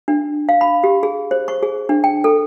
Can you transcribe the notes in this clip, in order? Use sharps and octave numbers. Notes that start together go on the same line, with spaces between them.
D4
F5
B5
G4
G#4
C5
C#6
G#4
D4
G5
A4